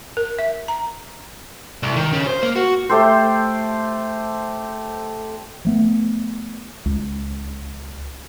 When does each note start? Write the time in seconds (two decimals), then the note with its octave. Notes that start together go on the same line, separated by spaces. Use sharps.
0.17 A#4
0.39 E5
0.68 A#5
1.83 C2
1.96 D#3
2.12 C#3
2.27 C5
2.43 A#3
2.56 F#4
2.89 A3 G4 A4 C5
5.65 F3 A3 B3
6.86 C#2